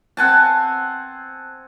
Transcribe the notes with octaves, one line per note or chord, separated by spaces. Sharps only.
C4 F#5 G#5 A5